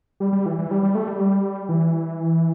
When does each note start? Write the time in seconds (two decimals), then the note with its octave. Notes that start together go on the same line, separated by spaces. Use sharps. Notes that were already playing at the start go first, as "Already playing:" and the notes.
0.20 G3
0.33 G3
0.46 E3
0.58 E3
0.71 G3
0.83 G3
0.95 A3
1.08 G3
1.69 E3